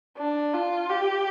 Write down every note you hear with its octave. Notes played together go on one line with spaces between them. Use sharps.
D4
F4
G4